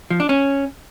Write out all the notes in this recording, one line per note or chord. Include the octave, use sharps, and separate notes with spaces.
F3
D4
C#4